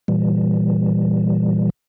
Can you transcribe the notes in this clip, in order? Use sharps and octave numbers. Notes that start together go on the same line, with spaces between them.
A#2 E3 G3